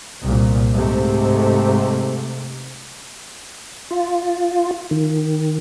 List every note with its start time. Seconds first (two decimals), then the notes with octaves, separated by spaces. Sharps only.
0.23 C2 A#2
0.73 G#2 C3 A3
3.91 F4
4.91 D#3